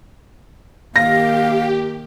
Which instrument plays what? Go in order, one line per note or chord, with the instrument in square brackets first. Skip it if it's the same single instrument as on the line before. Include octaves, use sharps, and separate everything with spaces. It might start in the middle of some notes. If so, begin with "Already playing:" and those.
[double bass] D#3 A#3 [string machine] G4 [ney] F5 [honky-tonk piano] A#6